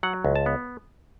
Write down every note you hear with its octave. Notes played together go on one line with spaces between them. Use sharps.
F#3 F#5
C#2
A5
B3